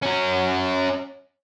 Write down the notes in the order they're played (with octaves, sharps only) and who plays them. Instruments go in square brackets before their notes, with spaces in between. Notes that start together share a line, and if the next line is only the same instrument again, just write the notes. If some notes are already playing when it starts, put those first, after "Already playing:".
[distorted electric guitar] C#4 F#4